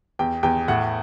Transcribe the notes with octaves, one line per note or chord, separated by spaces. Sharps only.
E2 G5
E2 G5
A2 F#5